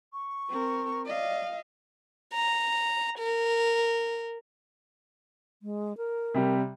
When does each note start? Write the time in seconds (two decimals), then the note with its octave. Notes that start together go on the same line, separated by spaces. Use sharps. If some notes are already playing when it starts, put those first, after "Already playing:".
0.13 C#6
0.50 C4 A#4
1.06 D5 D#5 F5
2.34 A#5
3.18 A#4
5.62 G#3
5.97 A#4
6.34 C3 G3